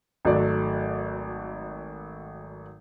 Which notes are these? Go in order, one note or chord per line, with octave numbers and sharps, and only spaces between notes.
G#1 F#3 A3 D5